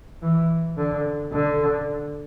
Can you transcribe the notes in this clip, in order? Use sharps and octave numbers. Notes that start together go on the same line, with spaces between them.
E3
D3
D3